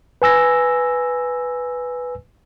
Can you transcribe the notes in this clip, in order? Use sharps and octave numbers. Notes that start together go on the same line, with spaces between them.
B4 G#5 E6 A#6